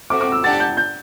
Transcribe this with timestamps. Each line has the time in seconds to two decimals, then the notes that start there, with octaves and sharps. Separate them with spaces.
0.10 A3 C4 F#4 D6
0.21 D6
0.32 E6
0.44 D4 G4 D5 F#5 A5 A6
0.60 G6
0.77 G6